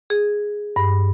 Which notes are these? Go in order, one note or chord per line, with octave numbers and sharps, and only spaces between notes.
G#4
G2